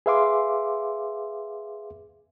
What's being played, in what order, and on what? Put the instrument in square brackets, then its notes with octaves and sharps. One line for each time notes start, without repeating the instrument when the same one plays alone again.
[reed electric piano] G#4 B4 E5 F5 C6 D6